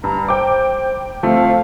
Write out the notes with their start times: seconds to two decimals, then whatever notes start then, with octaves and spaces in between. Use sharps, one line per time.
0.04 G2 A#5
0.28 C5 G5 D6
1.23 F3 A3 C4 F5